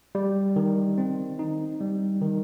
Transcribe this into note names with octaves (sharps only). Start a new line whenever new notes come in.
G3
D#3
C4
D#4
G3
D#3